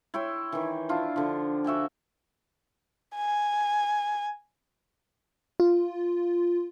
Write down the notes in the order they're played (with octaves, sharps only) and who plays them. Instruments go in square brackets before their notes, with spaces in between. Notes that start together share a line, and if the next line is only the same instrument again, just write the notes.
[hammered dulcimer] E4 C#5 G5 C6
D#3 E3
D4 E4 F4
D3 F3
F#4 E5 G5 G#5
[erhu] G#5
[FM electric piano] F4